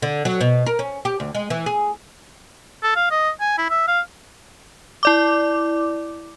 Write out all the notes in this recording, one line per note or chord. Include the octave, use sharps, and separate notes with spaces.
D3
F#3
B2
A#4
C#4
G4
D2
G#3
E3
G#4
A4
F5
D#5
G#5
E4
E5
F5
E4 D5 D6